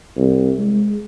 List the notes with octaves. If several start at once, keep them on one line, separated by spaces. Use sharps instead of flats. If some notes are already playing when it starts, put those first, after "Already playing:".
C2
G#3